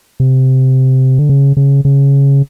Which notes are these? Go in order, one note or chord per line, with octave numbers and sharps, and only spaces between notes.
C3
D3
C#3
C#3
C#3